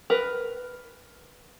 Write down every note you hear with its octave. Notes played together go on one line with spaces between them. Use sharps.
A#4 B4